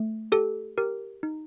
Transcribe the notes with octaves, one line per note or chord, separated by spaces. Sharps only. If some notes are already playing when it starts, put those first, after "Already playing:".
Already playing: A3
G4 A4
G4 A#4
D#4